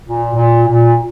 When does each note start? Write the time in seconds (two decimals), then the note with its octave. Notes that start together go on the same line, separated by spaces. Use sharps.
0.05 A#2
0.35 A#2
0.66 A#2